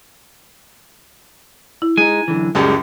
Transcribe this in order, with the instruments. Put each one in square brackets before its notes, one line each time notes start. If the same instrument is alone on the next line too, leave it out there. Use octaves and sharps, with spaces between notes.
[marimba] E4
[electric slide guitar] G#3 D#4 [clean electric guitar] G#5
[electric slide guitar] F#2 D3 E3
[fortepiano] C#2 F#2 G3 [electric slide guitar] G#3